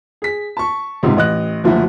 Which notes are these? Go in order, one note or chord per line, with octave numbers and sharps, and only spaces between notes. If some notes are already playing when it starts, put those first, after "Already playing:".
G#4 B6
A5 C#6
C#2 G#2 C3
A1 D#5 F#6
F#1 D2 F3 F#3 E4 F#4